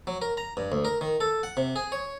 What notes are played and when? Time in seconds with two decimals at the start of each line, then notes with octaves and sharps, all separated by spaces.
0.07 F#3
0.22 A#4
0.37 A#5
0.57 G2
0.72 D2
0.85 A#4
1.01 D#3
1.20 A4
1.43 F#5
1.57 C3
1.76 G#4
1.92 C#5